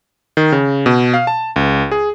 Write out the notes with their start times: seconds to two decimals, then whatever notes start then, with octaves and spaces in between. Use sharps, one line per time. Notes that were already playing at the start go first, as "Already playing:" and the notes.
0.37 D#3
0.52 C#3
0.86 B2
1.14 F5
1.27 A5
1.56 C#2
1.92 G#4